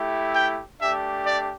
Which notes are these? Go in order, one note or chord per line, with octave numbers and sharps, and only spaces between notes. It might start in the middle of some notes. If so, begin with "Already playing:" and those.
Already playing: A3 E4 G4
G5
A3 D4 G4 E5
D5